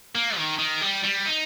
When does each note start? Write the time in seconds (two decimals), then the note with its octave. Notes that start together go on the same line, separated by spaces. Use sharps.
0.15 A#3
0.38 D#3
0.58 D#3
0.81 G3
1.04 G3
1.26 D#4